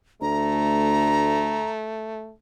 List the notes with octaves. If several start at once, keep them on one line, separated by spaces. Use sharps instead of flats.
D2 A3 A#5